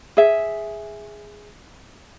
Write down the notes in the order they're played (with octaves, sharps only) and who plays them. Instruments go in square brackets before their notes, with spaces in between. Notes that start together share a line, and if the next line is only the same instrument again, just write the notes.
[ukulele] G#4 E5